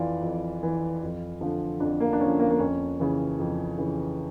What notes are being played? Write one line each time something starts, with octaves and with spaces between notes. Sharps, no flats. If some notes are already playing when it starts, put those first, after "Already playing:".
Already playing: F2 E3 F4 D5
F2
E3
F2
D3 F3
F2 D4
A#3
D4
D3 F3 C#4
A#3
A#3
F2 C#4
C#3 E3
F2
C#3 E3